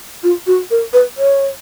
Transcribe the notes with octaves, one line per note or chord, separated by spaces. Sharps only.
F4
F#4
A#4
B4
C#5